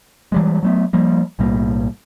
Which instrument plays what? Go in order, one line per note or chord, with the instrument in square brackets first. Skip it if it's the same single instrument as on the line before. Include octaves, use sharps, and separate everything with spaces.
[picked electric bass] E3 G3 G#3
F#3 A3 B3
F3 G3 A#3
B1 A2 G3 A#3